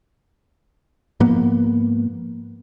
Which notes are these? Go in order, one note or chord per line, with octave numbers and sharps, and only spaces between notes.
G#2 F3 A#3 B3